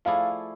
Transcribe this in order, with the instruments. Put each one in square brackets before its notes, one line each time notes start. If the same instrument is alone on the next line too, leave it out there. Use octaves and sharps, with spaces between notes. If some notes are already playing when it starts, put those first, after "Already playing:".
[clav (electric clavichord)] F3 A3 E4 G#4 D5 [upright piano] F5